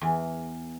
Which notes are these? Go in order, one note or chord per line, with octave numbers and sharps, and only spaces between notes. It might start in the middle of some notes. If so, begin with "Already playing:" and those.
E2